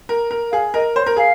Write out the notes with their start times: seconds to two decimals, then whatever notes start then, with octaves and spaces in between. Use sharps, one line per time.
0.09 A#4
0.31 A#4
0.52 G#4 F5
0.74 A#4 D#5
0.96 C5 C#5
1.06 A#4
1.17 G#4 F5